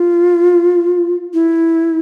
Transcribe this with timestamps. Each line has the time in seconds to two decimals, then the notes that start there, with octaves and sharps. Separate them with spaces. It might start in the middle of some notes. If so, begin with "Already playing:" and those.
Already playing: F4
1.34 E4